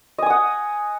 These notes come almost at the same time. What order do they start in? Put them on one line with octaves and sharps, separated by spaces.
D#5 G#5 D#6 F#5